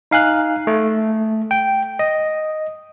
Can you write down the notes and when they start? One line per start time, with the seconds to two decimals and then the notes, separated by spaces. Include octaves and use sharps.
0.11 D#4 F5 G#5 F#6
0.67 A3
1.51 G5
1.99 D#5